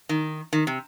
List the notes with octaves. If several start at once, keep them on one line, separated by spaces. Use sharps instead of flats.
D#3
D#3
C3